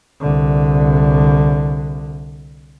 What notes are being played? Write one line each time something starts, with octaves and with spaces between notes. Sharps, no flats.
C2 D3